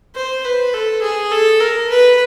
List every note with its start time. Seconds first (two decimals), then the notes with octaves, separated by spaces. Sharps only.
0.16 C5
0.45 B4
0.74 A4
1.02 G#4
1.31 A4
1.60 A#4
1.90 B4